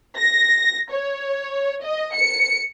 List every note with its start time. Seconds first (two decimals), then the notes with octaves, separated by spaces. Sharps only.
0.17 A#6
0.90 C#5
1.84 D#5
2.14 C#7